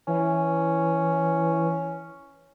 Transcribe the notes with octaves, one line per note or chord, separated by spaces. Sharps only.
E3 C#4